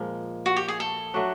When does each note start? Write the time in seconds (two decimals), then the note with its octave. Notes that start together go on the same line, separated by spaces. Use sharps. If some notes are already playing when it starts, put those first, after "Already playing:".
Already playing: A#2 F3 G#3
0.46 F#4
0.56 G4
0.68 G#4
0.80 A4
1.14 F#3 A3 D4 F#4